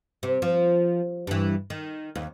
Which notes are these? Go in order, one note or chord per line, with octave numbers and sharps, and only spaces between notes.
C3
F3
G2 E3
D#3
D#2